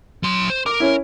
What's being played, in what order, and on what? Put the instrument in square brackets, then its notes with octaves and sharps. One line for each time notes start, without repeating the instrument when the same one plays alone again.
[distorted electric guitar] F#3 C6
C5
[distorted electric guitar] A#4 [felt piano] D6
[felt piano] C#4 E4